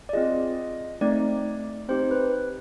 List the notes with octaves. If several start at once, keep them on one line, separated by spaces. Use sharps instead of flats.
D5
C4 F4 G#4 D#5
A3 C4 D#4 D5
C4 D#4 G4 C5
B4